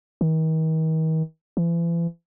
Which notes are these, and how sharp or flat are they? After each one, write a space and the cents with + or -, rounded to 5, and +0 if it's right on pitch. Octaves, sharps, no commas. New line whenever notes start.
D#3 +40
E3 +40